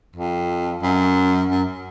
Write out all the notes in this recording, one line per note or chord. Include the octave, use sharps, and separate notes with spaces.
F2
F#2
F#2